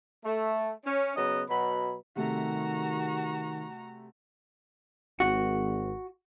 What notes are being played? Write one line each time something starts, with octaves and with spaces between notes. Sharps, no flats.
A3
C#4
C#3 F#3 B3 D#5
B2 F#3 B5
C3 D#3 G3 A3 F#4 A#5
G#1 F#4